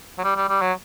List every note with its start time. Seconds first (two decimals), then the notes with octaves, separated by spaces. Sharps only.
0.18 F#3
0.24 G3
0.36 G3
0.49 G3
0.61 F#3